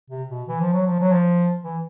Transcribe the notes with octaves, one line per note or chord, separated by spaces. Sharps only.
C3
B2
E3
F3
F#3
F3
F#3
F3
E3